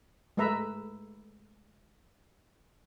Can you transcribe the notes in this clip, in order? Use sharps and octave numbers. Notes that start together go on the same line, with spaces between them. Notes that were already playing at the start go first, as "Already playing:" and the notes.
G#3 A3 B4 E5 A#5